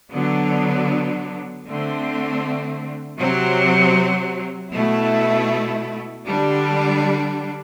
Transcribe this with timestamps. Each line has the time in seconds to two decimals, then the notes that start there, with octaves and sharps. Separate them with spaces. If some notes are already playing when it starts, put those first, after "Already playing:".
0.12 D3 F#3 B3 D4
1.66 D3 A3 C4
3.19 C3 F#3 C4
4.72 B2 A3 E4
6.26 D3 G3 D4